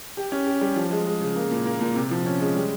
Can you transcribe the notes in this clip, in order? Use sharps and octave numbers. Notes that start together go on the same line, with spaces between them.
G4
C#4
G4
G3
F3
G#3
G#3
C#3
A#3
A#2
A#3
A#2
C3
F3
C#4
G#3
G3